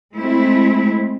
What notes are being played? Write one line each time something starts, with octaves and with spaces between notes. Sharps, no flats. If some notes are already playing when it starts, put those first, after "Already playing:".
G#3 A3 C4 E4